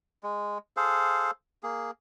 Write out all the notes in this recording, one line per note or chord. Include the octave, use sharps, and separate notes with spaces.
G#3
G#4 A4 C5 F5
A#3 G#4